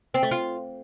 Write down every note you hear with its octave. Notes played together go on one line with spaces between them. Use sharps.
C4
A3
F4